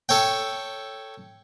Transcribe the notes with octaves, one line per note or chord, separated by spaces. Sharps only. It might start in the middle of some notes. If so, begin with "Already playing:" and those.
A4 C#5 G5